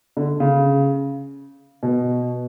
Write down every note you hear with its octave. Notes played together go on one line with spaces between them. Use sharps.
D3
C#3
B2